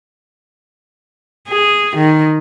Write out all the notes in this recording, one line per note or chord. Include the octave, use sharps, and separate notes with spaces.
G#4
D#3